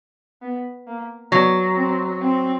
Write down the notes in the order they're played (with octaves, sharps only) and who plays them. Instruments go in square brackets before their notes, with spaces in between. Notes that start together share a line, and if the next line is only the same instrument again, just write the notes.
[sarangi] B3
A#3
[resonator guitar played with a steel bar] F#3 [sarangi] B3
[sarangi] C4
C4